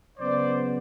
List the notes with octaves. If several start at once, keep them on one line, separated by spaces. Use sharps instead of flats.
C#3 F#3 B3 C5 D5